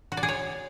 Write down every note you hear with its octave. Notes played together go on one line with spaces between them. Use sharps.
F#4
D5
G#4
C#5